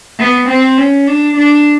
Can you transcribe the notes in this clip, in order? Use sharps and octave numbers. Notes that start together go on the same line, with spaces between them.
B3
C4
C#4
D4
D4